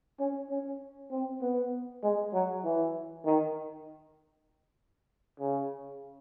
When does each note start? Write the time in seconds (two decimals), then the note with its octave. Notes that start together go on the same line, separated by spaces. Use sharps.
0.20 C#4
0.50 C#4
1.11 C4
1.41 B3
2.03 G#3
2.34 F#3
2.65 E3
3.26 D#3
5.40 C#3